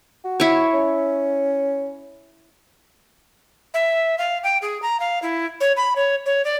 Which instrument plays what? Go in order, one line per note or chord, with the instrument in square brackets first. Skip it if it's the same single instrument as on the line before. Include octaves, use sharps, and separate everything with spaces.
[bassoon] F#4
[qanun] E4 C#5
[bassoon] C#4
[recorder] E5
F5
G5
G#4
A#5
F5
E4
C#5
B5
C#5
C#5
D5